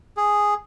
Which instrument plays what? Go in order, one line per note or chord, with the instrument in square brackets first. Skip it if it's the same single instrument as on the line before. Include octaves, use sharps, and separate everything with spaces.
[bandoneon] G#4